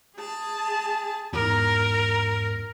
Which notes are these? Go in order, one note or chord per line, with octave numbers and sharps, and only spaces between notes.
G#4 A5
E2 G#2 A#4 A#5